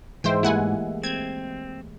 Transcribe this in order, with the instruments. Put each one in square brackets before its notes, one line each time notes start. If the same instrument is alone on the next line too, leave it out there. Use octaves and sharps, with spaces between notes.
[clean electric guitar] G#2 [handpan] E3 G#3 E5 [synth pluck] C5 G5
[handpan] A3 A#3 G4 [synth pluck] E4 F#5 G#5
[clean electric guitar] C4 [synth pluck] G#6